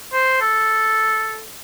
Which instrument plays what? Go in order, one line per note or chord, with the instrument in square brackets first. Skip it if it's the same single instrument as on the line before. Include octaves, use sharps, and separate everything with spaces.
[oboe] C5
A4